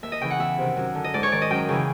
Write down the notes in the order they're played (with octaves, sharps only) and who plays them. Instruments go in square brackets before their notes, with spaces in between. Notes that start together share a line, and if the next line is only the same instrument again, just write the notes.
[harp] D#2 E5
D#5
C#3 E3 G5
F#5
E2 E5
C3 D#3
F#2
D3
D#5
G#2 D5
C#5
D#3 D5
D#5
F#2 G5
C#3 E3